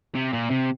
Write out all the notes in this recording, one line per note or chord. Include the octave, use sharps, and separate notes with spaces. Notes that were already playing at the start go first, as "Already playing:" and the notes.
C3
A#2
C3